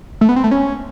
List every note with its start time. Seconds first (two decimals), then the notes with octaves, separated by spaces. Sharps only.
0.21 A3
0.29 B3
0.36 C4
0.44 A3
0.51 C#4